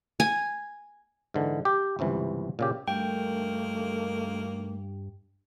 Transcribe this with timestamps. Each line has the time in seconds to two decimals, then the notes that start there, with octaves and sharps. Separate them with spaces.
0.20 G#5
1.34 G#2 D3 E3
1.65 G4
1.99 G1 C#2 C3 E3
2.59 A#2 C#3 G4
2.88 D2 G2 D#3 A3 A#3 G5